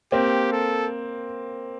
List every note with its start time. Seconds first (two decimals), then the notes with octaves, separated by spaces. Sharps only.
0.12 A#3 C4 G4
0.52 A4